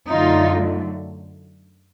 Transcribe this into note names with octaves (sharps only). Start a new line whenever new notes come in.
F#2 D3 F#3 A3 D#4 F4